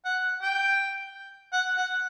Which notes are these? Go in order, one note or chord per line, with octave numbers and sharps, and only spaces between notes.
F#5
G5
F#5
F#5